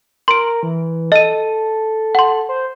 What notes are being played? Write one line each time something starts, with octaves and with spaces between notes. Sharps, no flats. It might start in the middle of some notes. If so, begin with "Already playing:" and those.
A#4 C6 D7
E3
A4 D#5 D#7
F#5 C6
C5